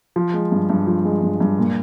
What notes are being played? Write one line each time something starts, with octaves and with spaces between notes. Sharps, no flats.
F3
G#3
G2
G2
F3
G#3
G2
G2
A#2